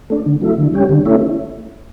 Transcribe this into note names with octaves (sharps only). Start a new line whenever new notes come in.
A3 D4
D3
F#3 A3 E4
D3
G3 C#4 G4
D3
A3 C#4 E4